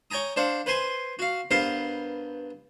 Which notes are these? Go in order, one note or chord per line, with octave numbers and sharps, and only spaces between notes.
C#5 G5 G#5 A#5 D#6
D4 C5 F5 F#5
B4 C5 G#5 C6
F#4 F5
G2 B3 A#4 C5 F5